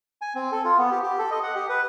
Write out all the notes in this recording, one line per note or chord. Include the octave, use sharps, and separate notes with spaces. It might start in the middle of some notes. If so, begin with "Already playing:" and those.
G#5
C4
A4
F4
B3
G4
G4
A4
D#5
F#5
G4
B4